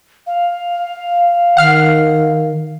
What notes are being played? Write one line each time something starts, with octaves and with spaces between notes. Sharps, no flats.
F5
D#3 F#5 F6 C7